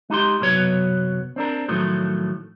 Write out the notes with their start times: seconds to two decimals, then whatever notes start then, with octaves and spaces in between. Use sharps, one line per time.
0.10 G#3 D#4 G4 C6
0.41 C2 F#2 B2 F#3 B3 C#5
1.36 C4 D4 A#4
1.68 A2 D#3 F3 F#3 A3